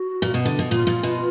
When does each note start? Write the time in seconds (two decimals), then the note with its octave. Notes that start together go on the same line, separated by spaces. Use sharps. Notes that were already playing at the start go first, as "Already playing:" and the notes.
Already playing: F#4
0.22 A#2
0.34 B2
0.45 D3
0.59 B2
0.71 A#2 F4
0.87 A#2
1.03 B2